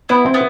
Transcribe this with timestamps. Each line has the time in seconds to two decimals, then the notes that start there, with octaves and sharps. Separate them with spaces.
0.09 B3 E4
0.26 C4
0.34 B3